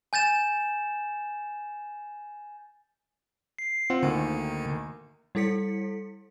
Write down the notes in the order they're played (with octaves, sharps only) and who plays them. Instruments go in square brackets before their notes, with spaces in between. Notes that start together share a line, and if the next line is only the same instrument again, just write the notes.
[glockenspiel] G#5 G6 A6 E7
[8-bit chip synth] C7
[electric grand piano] C4 F4 F#5
[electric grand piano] D2 D#3 A#3 [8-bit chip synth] D3
[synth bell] G3 E4 A4 B6 C#7